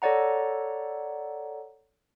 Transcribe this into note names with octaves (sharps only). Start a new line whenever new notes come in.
A4 C#5 D5 F#5 A#5